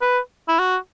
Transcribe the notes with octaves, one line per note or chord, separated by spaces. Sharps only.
B4
E4
F#4